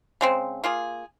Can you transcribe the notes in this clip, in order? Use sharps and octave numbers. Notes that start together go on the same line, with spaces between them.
C#3 G#3 C4
A#3 F4 G#4